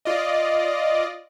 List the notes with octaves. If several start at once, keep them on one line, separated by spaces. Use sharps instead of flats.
F4 D5 D#5